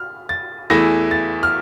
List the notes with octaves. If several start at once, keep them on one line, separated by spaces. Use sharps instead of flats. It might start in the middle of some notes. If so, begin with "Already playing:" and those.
Already playing: F6
A6
E2 E3 A3 E4 A#6
A6
F6